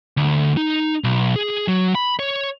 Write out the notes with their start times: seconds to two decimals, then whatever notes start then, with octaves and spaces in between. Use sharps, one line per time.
0.17 D2
0.57 D#4
1.04 B1
1.36 G#4
1.68 F#3
1.95 B5
2.19 C#5